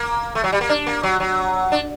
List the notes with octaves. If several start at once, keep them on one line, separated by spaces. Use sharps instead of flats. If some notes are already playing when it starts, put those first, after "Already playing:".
Already playing: A#3
A3
F#3
G3
A#3
D4
A#3
F#3
F#3
D4